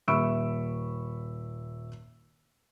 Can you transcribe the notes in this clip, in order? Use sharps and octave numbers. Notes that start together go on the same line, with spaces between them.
D#1 E5 B5 C#6 E6 D7